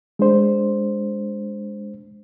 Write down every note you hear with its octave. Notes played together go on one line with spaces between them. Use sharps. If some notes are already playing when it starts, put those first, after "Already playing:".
G#3 D4 C5